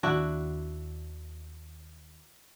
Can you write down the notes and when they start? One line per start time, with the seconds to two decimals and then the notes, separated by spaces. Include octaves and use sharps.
0.03 D#2 D4 E4 F#4